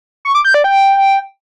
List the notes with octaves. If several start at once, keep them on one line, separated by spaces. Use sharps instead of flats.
C#6
D6
G6
D5
G5